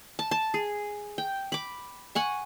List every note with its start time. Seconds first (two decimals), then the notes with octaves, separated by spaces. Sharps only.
0.19 A5
0.31 A5
0.54 G#4
1.18 G5
1.52 B5 D6
2.15 F#5 G#5 C#6